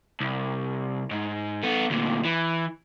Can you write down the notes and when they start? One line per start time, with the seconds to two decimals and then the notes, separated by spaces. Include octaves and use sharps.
0.20 C2
1.11 G#2
1.63 B3 A4
1.90 D2 A#2
2.25 E3